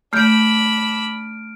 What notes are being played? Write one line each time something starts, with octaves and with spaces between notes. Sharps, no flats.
A3 D4 B5 F6 G6 D7